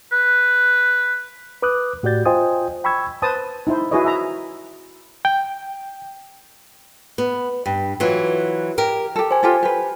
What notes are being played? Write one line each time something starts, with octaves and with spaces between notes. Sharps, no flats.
B4
B4 D6 D#6 F#6
A2 F#4 G4 D5 G6 A6
F4 C5 D#5 G5 G#5 D#6
G5 B5 C#6 E6 G#6
B4 C5 A5 D#6
D#4 E4 C5
E4 F#4 G#4 B4 C#5 D#5
E5 A#5
G5
B3
G2
E3 F#3 F4
G4 A#4
G4 A4
C5 G#5
F4 G4 A4
G4 B4